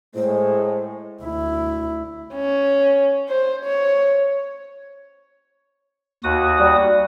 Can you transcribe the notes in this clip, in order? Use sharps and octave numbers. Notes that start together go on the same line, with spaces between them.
A2 G#3 C5
D2 E4
C#4
C5
C#5
D#2 F#4 D#6
G3